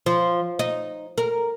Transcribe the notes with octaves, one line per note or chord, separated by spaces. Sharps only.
F3
D#4
A#4